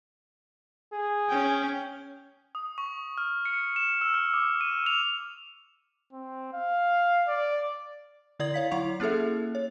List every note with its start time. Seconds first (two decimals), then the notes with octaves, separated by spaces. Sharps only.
0.92 G#4
1.30 C#4 G5
2.55 D#6
2.78 C#6
3.18 F6
3.45 C#7
3.76 E7
4.01 E6
4.14 F6
4.34 D6
4.61 D#7
4.86 F7
6.13 C4
6.53 F5
7.28 D5
8.39 D3 E4 D5 D#6 G#6 F#7
8.54 E4 C#5 F5 B6
8.71 F#3 E4 F#5 C#6 F7
9.00 A#3 C#4 E4 G#4 A4 E5
9.55 C#5